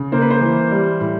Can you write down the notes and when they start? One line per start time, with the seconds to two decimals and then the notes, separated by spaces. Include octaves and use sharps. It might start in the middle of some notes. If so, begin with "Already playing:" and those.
Already playing: C#3
0.12 A#3 C5
0.21 B4
0.30 C5
0.41 E3
0.71 G3
1.01 A2